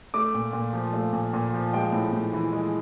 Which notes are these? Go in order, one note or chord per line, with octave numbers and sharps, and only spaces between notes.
A3 D6
A#2
A#2
F3
A3
A#2
A#2
F3
G#3 G5
A2
A2
E3
G#3